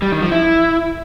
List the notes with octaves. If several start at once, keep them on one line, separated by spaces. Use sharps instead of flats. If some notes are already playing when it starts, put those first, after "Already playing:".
G3
D#3
F3
E4